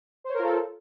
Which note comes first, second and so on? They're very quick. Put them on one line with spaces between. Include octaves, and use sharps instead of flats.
C5 C#5 A#4 F4 A4